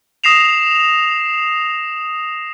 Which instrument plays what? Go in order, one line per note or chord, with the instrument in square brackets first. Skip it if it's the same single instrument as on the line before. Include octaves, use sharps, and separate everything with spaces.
[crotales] D#6 A#6 C7 E7 F7